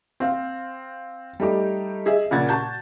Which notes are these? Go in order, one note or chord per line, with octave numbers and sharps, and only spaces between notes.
C4 F5
G3 A3 D#4 G4
G#4 D#5 E5
A#2 C#3 F#5 G#6 A6
F#4 A5 G6